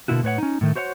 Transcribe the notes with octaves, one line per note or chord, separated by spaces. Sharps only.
B2 D3 A#3 E4 F#4
A2 B4 C#5 F#5
C#4 D#4
A2 D#3 A3
F#4 C5 C#5 E5 F#5